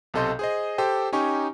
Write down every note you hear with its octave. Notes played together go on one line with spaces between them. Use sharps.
B1 C3 A4 D#5 C6 G6
G#4 C5 D#5
G4 A4 C5 G5
C#4 D#4 G4 G#5 C#6